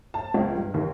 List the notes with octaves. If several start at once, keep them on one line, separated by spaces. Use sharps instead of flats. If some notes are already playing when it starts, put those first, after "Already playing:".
A5
C#2
G2
D#2